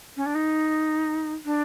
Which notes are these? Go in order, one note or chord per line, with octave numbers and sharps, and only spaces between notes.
C#4
D4
D#4
D4